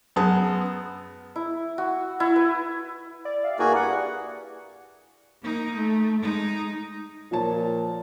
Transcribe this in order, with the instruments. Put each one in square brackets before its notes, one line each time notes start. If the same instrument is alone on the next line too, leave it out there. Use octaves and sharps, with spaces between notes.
[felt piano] F#2 B3 G#4 A5
[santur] E4
F#4
E4
B4
[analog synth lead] D5
[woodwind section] G4 E5 F5
[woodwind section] G2 E4 [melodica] A#3 F#4 G#4
[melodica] F#5
[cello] A#3 D#4
A3
G#3 D#4
[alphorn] A#2 [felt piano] F3 C#5 A5